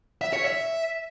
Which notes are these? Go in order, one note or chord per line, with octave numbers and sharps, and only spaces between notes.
E5
C#5
E5